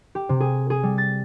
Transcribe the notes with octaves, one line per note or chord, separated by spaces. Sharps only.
G4
C3
G#4
G#4
G3
A6